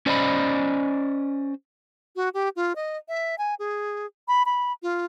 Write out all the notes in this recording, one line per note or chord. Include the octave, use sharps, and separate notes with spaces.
C#4 C5 D5 D#5 G#5 B5
F#4
G4
F4
D#5
E5
G#5
G#4
B5
B5
F4